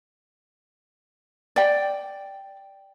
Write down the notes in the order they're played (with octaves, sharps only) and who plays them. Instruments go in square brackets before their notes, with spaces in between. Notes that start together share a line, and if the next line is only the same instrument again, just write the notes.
[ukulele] D5 G5